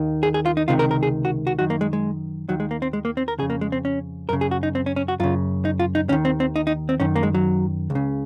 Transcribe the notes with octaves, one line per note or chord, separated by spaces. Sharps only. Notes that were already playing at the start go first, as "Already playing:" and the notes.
Already playing: D#2 D#3
G#4
G#4
F4
D#4
C#2 C3 D#3 F4
A#4
A#4
G#4
F#4
F#4
F#2 D#3 F#4
A#3
G#3
G#3
D#2 D#3 F#3
G#3
A#3
C4
G#3
A#3
C4
A#4
F2 C#3 G#4
A#3
G#3
C4
C#4
F#2 C#3 A#4
G#4
F#4
D#4
C4
C#4
C#4
F#4
F#2 C#3 F4
D#4
F4
D#4
D#2 D#3 C#4
C4
C4
D#4
D#4
C4
F#2 D#3 C#4
A#3
G#3
F#3
C#2
C#3